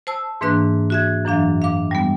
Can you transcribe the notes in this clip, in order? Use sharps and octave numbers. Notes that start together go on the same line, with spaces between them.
C5 A5 E6
G#2 E3 A#3 D4 B4 F#6
F#4 E5 G#6
F#2 E3 F#3 D4 F5
F5 D6
G3 G#3 B3